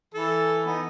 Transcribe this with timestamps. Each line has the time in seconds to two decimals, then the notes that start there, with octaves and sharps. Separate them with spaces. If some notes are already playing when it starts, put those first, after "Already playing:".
0.14 E3 A4
0.66 B3 D#4